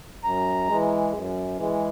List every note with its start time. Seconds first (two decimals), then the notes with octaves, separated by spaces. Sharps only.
0.24 F#2 A#5
0.68 E3 G#3
1.13 F#2
1.57 E3 G#3